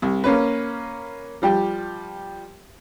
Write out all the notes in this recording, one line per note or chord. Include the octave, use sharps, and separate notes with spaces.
C2
A#3 C#4 B4
F3 G3 G4